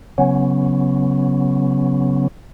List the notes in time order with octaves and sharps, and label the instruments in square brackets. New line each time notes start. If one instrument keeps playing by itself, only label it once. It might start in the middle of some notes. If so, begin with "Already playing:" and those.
[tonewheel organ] C#3 F#3 B3 C#4